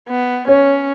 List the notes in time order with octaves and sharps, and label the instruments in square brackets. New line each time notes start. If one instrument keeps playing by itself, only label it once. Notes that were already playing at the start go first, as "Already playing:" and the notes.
[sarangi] B3
[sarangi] C#4 [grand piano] C#5